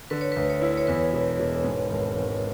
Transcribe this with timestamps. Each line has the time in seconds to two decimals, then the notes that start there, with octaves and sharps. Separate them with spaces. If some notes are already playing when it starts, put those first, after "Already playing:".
0.10 D3 B4
0.21 C#5
0.32 D2 B4
0.50 C#5
0.61 E4
0.77 C#5
0.87 E2 B4
1.13 E1
1.39 E1
1.64 G#2
1.90 G#1
2.16 G#1